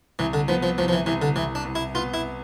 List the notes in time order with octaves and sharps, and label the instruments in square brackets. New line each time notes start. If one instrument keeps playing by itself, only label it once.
[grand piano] C2 [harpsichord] E3
[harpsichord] D3
[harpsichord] F3 [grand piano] B3
[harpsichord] F3
[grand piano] C2 [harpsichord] F3
[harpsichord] F3
E3
[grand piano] C2 [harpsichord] E3
[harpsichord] D3
[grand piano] C2 [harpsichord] E3
[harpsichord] D4
[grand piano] C2
[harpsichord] E4
[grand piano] B3 [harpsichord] F4
[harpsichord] E4